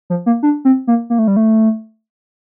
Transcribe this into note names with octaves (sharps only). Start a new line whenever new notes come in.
F3
A#3
D4
C4
A#3
A#3
A3
G3
A3